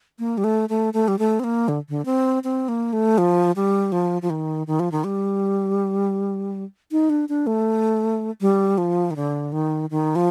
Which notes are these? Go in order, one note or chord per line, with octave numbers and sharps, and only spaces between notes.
A#3
G3
A3
A3
A3
G3
A3
C4
A#3
D3
D3
C4
C4
A#3
A3
F3
G3
F3
F3
D#3
D#3
F3
D#3
G3
D#4
D4
D4
A3
G3
F3
D#3
D3
D#3
D#3
F3